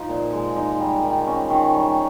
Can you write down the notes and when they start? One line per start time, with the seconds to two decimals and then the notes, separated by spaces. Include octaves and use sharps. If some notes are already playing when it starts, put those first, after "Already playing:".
Already playing: F3 D#4
0.09 A#2
0.33 G#3
0.56 D#4
0.80 G3
1.04 D#3
1.27 C#4
1.50 D#3
1.75 G3